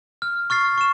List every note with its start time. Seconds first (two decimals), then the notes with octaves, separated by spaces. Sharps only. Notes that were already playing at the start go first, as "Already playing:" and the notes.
0.22 F6
0.50 C#6 F6 A6 C7
0.78 C#6 E7